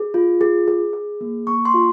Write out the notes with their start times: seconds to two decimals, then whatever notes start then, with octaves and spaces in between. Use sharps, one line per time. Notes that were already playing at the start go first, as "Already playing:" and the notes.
Already playing: G#4
0.14 F4
0.41 G#4
0.68 G#4
0.93 G#4
1.21 A#3
1.47 A#3 C#6
1.65 C6
1.74 F4